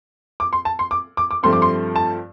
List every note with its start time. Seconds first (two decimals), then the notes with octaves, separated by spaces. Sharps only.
0.40 D6
0.53 C6
0.65 A5
0.79 C6
0.91 D6
1.17 D6
1.31 D6
1.43 G2 F3 A3 C4 C6
1.53 D6
1.62 C6
1.96 A5